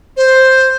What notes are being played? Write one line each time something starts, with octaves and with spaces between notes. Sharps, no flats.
C5